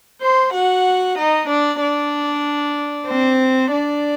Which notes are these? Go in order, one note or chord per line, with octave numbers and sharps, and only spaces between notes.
C5 C6
F#4 F#5
D#4 D#5
D4 D5
D4 D5
C4 C5
D4 D5